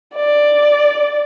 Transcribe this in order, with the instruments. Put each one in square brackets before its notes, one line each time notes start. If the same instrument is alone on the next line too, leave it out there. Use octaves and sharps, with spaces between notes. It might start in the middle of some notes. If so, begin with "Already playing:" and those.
[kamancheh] D5